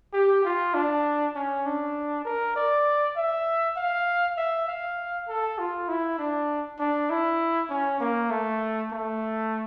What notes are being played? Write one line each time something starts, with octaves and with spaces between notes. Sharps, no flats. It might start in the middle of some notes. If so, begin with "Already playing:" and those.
G4
F4
D4
C#4
D4
A#4
D5
E5
F5
E5
F5
A4
F4
E4
D4
D4
E4
C#4
A#3
A3
A3